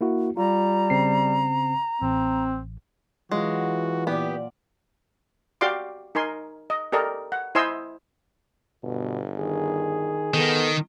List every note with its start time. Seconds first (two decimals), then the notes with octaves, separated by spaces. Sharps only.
0.01 A#3 E4 F#4
0.37 G3 F4 A#5
0.90 C#3 C4 C7
2.02 A1 C4
3.31 E3 F#3 G#3 F4 F#4
4.07 A#2 B3 G4 D5
5.61 F#4 G4 D5 F5 C6 D6
6.15 D#4 A#4 G#5 C6
6.70 D#5
6.92 G4 A4 A#4 D5 D#5
7.32 F#5
7.55 E4 C5 D#5 G#5 C6 E6
8.83 G1 B2
9.39 D#3 G#4
10.34 D#3 B3 A4